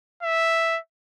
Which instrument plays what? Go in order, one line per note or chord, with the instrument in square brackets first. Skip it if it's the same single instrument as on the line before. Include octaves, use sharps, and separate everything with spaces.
[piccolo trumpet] E5